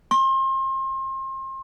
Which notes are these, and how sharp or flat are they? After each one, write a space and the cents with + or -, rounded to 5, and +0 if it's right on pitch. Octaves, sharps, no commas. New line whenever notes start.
C6 +35